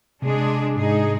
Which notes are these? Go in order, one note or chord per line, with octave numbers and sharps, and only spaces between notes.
C3 G#3 D4 G#4
G#2 G#3 D#4 G#4